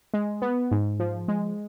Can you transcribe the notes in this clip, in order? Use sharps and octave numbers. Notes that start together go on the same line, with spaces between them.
G#3
B3
G#2
F3
G#3